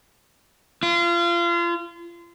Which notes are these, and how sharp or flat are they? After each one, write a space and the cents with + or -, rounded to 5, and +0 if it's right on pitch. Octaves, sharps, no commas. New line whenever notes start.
F4 -30